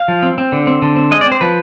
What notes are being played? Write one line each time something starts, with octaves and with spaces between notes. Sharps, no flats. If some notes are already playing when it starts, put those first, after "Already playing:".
Already playing: F5
F3
C4
C4
D3
C4
D3
C4
G#3 D#5
D5
C4
C5
F3 B4